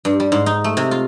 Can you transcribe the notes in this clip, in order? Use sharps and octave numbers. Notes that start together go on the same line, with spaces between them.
G2
G3
G#2
D#4
A3
C3
F4